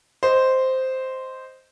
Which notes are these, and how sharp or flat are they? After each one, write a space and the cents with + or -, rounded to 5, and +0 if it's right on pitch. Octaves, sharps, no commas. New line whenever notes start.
C5 -5 D#5 +0